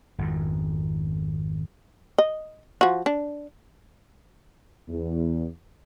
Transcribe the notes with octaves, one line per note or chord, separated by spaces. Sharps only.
G#1 F2 G#2
D#5
F3 F#4
D4
E2